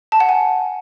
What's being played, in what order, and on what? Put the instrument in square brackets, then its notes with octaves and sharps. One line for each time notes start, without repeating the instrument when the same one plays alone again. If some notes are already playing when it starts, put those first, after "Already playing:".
[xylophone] A5
F#5
G#5